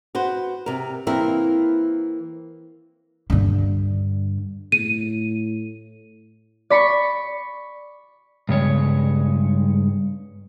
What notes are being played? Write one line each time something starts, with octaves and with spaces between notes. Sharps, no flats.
F#4 B4 C5
C3 A#4
E3 A#3 C4 E4 A#4
G2 D3
A2 D#7
D5 B5 C#6 C#7
G2 C#3 G#3 C#5